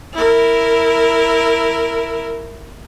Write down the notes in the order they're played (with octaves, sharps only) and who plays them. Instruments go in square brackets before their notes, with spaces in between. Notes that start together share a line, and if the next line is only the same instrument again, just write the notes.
[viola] E4 A#4